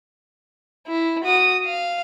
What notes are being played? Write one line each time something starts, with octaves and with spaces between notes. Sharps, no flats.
E4
F#4 D#6
F5